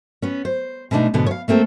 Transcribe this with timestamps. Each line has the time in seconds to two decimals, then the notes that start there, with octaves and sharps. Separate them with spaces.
0.22 B3 C#4
0.45 C5
0.91 B2 G#3 A3 B3 D4 D#4
1.14 G#2 B2 D3 B3
1.26 C#5 F5
1.48 A3 A#3 C4 A4